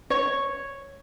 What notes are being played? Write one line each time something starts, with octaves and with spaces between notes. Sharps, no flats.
C#5